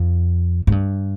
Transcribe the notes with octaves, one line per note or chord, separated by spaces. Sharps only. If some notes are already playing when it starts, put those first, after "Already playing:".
Already playing: F2
G#2
G2